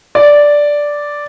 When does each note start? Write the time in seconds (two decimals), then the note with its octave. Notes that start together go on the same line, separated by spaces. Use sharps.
0.15 D5